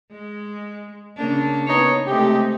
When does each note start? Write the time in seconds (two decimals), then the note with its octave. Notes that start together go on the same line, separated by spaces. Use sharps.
0.11 G#3
1.17 C#3 A#3 D4
1.67 B3 D#4 C#5
2.06 C3 G#3 A3 D#4 G4